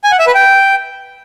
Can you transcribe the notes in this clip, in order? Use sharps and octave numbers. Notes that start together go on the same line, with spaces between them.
G#5
F#5
E5
B4
G5